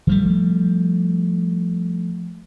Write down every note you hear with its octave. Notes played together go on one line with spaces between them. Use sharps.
F3 G3 A3